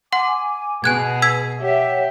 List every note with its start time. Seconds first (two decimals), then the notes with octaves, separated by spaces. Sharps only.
0.12 F#5 G#5 C6 D6
0.84 B2 G#4 B4 G#5 F#6 G#6
1.22 E6 G#6 B6
1.60 G4 C#5 E5 F#5